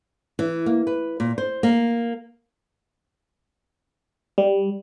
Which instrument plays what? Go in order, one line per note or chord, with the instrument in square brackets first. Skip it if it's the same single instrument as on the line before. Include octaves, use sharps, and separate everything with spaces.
[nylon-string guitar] E3
A#3
B4
A#2
C5
A#3
[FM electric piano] G3